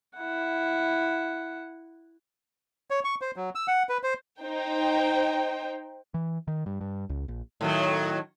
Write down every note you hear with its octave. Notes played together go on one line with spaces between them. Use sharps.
E4 F#5
C#5
C#6
C5
F#3
E6
F#5
B4
C5
D#4 C5 G5
E3
D#3
G2
G2
C#2
A#1
A2 D#3 F#3